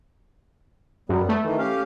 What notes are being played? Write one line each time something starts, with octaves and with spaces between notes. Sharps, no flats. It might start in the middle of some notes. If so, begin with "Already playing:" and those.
F#2 G3 B3
A3
D#3 E3
C#4 G4 F5